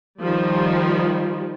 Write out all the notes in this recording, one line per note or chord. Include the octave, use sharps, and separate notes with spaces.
D#3 F3 G3